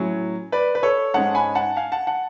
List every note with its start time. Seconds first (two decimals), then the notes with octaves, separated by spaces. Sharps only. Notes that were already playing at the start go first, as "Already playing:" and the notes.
Already playing: A2 F#3 C#4
0.52 B4 D5
0.75 B4
0.83 A4 C#5
1.14 G#2 G#3 C#4 F#5 A5
1.35 G#5 B5
1.55 F#5 A5
1.77 F5 G#5
1.92 F#5 A5
2.07 F#5 A5